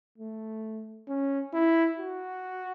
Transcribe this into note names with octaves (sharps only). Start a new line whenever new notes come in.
A3
C#4
E4
F#4